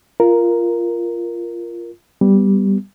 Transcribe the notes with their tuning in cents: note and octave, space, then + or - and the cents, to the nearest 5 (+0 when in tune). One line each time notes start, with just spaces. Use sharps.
F4 -15 A#4 +0
G3 +0 B3 +5